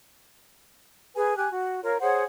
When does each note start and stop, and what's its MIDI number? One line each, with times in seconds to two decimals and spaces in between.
1.15 1.36 68
1.15 1.36 71
1.15 1.36 80
1.37 1.49 67
1.37 1.49 80
1.37 1.49 90
1.51 1.82 66
1.84 1.96 65
1.84 1.96 70
1.84 1.96 73
2.01 2.23 68
2.01 2.23 72
2.01 2.23 73
2.01 2.23 78